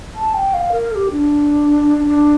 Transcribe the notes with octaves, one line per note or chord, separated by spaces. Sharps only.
A5
G5
F5
A#4
A4
G4
D4
D4